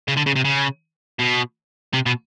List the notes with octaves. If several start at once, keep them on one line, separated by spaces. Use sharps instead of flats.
C#3
D3
C#3
C3
C#3
B2
C3
B2